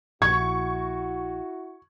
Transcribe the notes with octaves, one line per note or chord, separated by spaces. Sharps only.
A#1 E4 F#4 C#6 G#6